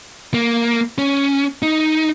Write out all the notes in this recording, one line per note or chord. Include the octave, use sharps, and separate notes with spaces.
A#3
C#4
D#4